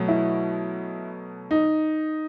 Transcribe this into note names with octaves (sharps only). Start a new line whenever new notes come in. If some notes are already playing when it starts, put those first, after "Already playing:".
Already playing: B2 F#3 A3
E4
D#4